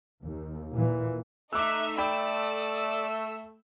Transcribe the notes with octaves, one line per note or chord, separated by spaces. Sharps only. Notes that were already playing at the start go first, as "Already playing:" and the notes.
D#2
A#2 E3
A3 D#4 E5 D6 E6 F#6
D5 G5 B5 E6